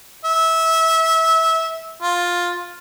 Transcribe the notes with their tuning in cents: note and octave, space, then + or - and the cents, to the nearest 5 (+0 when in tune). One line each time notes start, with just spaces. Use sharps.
E5 -20
F4 +10